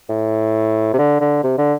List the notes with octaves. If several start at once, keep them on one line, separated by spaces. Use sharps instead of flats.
A2
C3
D3
D3
C3
D3